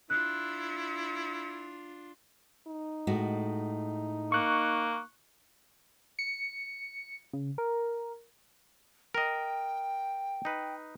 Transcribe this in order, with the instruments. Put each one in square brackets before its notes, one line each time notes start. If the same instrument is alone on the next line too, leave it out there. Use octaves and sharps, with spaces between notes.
[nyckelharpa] D4 F4 [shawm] E4 [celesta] F#6
[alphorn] D#4
[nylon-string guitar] A2 G#3 F#4
[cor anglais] A#3 [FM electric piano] C#6 F#6
[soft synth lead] C#7
C#3
A#4
[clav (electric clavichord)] A#4 D#5 [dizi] G5
[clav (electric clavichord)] D#4 B4